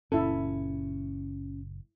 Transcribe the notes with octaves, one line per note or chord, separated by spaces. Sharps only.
F#1 A#2 C#4 E4 A4